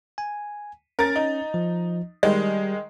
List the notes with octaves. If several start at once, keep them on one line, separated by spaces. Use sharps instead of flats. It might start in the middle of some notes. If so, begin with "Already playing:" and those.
G#5
C#4 A#4 A6
D#4
F3
D#3 G3 G#3